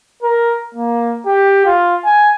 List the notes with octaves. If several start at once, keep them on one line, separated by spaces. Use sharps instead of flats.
A#4
A#3
G4
F4
G#5